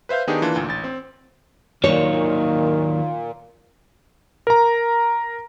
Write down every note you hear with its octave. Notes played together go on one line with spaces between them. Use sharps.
B4 C5 E5 F5 G6
D#3 B3 D4 D#4 G4 G#4
E3 A#3 D4 F4
D2 A#2
A1 A6
C4
D#2 A#2 D#3 F#3 C#5
A#4 A#5